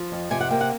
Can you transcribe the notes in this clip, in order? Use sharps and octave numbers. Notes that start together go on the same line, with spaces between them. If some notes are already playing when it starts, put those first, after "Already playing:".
Already playing: F3
F2
C3 G#5
F#5
A#3 G5
F#5